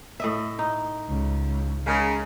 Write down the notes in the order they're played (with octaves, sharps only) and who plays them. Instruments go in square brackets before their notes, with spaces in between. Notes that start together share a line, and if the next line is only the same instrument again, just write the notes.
[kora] A2 D#5 E5
D#4
[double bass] C#2
[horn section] C#3 A#4 [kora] G#3